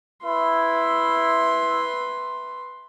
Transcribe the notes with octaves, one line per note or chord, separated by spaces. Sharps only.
E4 B4 C6